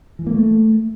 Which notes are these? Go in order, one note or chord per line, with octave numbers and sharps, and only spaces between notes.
E3
A#3
A3